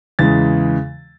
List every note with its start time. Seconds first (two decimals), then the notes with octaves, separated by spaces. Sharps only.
0.19 E2 C#3 E3 G#3 A6